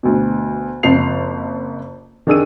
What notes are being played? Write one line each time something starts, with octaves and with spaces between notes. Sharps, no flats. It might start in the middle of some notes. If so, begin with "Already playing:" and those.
D2 B2
F#1 F2 F3 A5 C7 F7
D#3 D4 G#4 E6 D#7